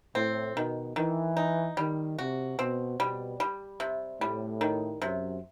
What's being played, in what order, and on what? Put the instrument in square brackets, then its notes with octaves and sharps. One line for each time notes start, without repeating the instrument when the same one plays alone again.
[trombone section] A2 [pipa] C4
[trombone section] B2 [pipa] D#3
[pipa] D#3 [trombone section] E3
[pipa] D#4
[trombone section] D#3 [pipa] G3
[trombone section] C3 [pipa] F#4
[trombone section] B2 [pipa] C4
[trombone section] B2 [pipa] G3
[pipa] G3
C3
[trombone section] A2 [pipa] G3
[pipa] D#3
[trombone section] F#2 [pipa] C3